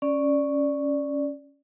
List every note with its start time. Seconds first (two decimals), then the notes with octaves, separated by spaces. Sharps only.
0.02 C#4 D5